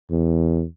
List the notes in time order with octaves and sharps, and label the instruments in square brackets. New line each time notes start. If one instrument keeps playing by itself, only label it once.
[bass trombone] E2